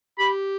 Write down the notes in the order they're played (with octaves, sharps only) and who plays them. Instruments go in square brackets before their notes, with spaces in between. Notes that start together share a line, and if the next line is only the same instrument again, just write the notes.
[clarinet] G4 [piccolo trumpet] B5